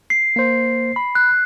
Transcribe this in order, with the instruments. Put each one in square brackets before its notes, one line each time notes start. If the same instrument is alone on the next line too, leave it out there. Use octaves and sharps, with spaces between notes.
[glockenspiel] C7
[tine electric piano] A#3 C5
B5
[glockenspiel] F#6